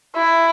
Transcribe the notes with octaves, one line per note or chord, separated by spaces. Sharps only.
E4